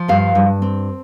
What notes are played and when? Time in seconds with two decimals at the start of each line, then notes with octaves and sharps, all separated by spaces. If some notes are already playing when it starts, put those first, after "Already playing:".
Already playing: F3
0.08 G2 F5
0.35 G2
0.62 C4